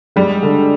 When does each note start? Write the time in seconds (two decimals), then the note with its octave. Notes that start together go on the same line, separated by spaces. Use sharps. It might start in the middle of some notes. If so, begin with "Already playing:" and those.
0.16 G3 G#3
0.43 D3